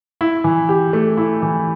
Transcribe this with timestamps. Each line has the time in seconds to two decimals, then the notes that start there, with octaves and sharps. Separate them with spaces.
0.21 E4
0.44 E3
0.69 G4
0.93 A3
1.17 E4
1.42 E3